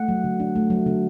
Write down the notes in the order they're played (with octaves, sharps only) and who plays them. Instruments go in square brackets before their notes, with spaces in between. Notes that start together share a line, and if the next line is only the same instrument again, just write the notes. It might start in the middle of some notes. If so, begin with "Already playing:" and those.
Already playing: [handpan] A3 F#5
F#3
D3
D4
A3
F#3
D3